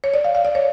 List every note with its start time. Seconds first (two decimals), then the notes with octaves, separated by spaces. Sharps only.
0.04 C#5
0.14 D5
0.24 F5
0.35 F5
0.45 D5
0.55 C#5